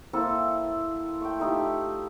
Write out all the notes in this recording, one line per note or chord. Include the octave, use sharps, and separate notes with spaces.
A#3 C4 E4 A4
A3 G5
A3 D#4 F4 G4